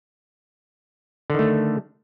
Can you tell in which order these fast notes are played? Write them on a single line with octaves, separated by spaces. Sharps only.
D3 D#3 A3